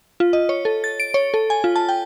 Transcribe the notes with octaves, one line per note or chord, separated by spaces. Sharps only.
F4
D#5
C#5
A4
A6
D7
C#5
A4
G#5
F4
A5
G5